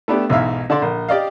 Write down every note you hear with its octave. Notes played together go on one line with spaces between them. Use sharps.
A3 B3 D4 G4
B1 G#2 E3 E5 F5
D3 D4 A4 D5 C6
A#1
G4 D5 D#5 F5